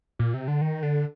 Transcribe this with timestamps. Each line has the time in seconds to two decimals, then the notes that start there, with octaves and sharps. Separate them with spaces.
0.19 A#2
0.34 C3
0.48 D3
0.61 D#3
0.83 D3